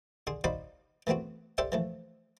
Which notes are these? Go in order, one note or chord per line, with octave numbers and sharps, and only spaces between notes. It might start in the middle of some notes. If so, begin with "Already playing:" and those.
D3 G#4 C6
D#4 F#4 C5 D5 F5 B5
E3 A3 B3 C4 F#4
G4 A4 C5 D5 E5 F#5
E3 F3 A3